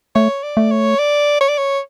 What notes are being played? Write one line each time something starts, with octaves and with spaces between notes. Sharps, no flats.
A3 C#5
D5
A3
C#5
D5
C#5
D5
C#5